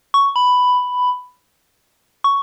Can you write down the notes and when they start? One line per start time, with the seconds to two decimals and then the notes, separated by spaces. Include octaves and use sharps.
0.14 C#6
0.36 B5
2.24 C#6